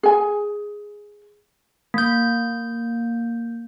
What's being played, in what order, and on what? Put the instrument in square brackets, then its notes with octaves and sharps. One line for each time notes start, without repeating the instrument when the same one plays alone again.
[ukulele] G#4 G#5
[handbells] A#3 G6